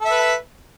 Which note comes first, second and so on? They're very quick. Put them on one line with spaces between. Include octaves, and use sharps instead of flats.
A4 E5 B4